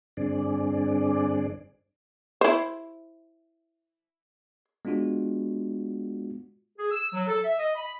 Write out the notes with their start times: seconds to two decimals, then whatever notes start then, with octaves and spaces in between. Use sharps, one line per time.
0.17 G2 D3 C4 D4 G#4 D5
2.41 E4 C5
4.85 G#3 B3 D4 F4 F#4
6.78 G#4
6.91 E6
7.12 F#3
7.27 A4
7.44 E5
7.58 D#5
7.75 B5